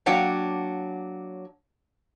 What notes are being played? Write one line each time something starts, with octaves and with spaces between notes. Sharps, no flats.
F#3 A#3 D4 C#5 F#5 G5